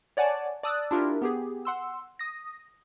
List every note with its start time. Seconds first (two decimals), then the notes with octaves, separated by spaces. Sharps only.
0.17 C#5 D5 F#5 G#5 A5
0.63 D5 A5 D#6 E6 F#6 A6
0.91 D4 E4 F4 G4 A#4
1.22 B3 G4 G#4
1.65 F#5 C6 E6
2.19 D#6 A#6